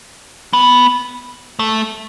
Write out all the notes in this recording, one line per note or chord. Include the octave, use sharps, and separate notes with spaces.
B3
A3